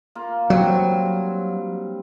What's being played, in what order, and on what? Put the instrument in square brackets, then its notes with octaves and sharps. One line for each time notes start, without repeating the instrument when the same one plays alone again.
[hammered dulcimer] A#3 F4
[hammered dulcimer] G2 G3 C4 [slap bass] F#3